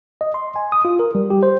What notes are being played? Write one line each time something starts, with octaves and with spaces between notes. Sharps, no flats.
D#5
C6
G#5
D#6
F4
A#4
G3
G4
C5